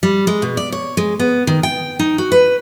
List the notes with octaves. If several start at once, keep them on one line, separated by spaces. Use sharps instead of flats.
G3
G#3
B2
D5
C#5
G#3
B3
D#3
G5
D#4
F#4
B4